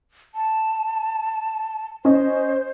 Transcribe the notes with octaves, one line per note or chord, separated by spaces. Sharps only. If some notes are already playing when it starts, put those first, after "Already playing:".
A5
C#4 C5 D#5